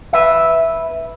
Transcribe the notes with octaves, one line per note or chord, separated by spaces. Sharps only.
B4 E5